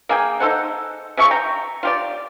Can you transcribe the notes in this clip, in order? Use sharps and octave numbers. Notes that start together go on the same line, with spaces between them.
A#3 G#4 G5
D#4 A4 C5 F#5
C#3 F3 E5 C#6
G5 A#5
F4 G4 D5